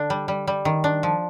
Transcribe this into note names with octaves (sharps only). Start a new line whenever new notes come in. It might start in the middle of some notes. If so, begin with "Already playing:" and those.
Already playing: D3 D4
G3
G3
G3
D#3
D4
F3